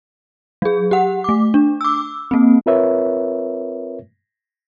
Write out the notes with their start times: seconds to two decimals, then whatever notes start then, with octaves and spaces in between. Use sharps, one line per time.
0.62 F#3 G#4
0.91 G4 F#5
1.24 A3 D6
1.54 D4
1.81 D6 E6
2.31 A#3 C4
2.66 C4 F4 A#4 B4 C#5 E5